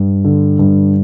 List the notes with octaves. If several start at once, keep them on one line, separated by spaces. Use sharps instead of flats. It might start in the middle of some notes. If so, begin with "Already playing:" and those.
Already playing: G2
D3
G2